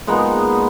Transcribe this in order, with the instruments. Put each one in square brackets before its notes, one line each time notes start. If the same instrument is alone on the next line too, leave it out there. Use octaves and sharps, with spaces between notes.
[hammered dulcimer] A#2 G#3 B3 D#4